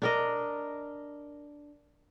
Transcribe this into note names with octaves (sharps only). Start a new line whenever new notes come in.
D4 A#4 D#5